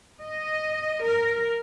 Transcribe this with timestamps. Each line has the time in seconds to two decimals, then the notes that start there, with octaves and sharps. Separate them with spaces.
0.21 D#5
1.02 A#4